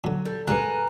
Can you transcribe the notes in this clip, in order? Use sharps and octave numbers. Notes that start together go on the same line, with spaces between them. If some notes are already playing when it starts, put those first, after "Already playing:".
A#2 D3 F#3
G3 A4
C#2 G2 A#2 A#4 B4 G#5 F#6